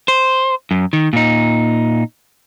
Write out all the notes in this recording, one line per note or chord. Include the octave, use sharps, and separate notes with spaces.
C5
F#2
D#3
A#2 D#4